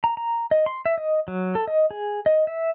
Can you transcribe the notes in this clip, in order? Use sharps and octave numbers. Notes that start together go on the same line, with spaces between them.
A#5
A#5
D#5
C6
E5
D#5
F#3
A4
D#5
G#4
D#5
E5